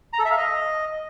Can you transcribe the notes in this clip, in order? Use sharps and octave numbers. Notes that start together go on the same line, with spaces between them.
A#5
A4
E5
F5
D#5